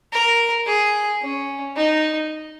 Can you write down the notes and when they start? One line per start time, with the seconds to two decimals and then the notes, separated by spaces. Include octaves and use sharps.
0.12 A#4
0.67 G#4
1.22 C#4
1.77 D#4